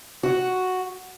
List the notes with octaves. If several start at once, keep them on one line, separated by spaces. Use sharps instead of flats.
F#4